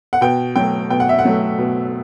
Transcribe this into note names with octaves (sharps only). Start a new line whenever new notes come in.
F#5
B2 G5
F#3 A3 G5
B2 G5
F#5
E5
F#5
F#3 A3
B2